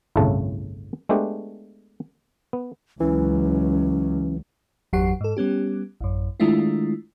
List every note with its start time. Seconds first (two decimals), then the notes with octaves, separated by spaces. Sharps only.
0.16 G1 C2 A2 C#3 A3 A5
1.09 G#3 A3 B3 D4 G4
2.53 B3
3.00 C#2 E3 F#3 C#4
4.93 G1 E2 F#3 G4 F#5 C7
5.21 G#2 A4
5.37 G3 B3 C#4 G4
6.01 A1 F#2
6.40 D#3 G#3 A3 D4 E4 F4